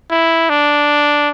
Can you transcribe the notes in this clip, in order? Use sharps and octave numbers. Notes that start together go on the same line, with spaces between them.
E4
D4